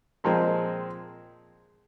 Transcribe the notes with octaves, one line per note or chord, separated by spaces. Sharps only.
A#2 F3 G#3 C4